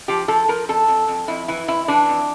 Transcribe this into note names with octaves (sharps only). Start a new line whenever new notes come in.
F3 G4
F3 A4
F3 A#4
F2 A4
F2
F2
F2 E4
E3 E4
F2 E4
E3 D4
F2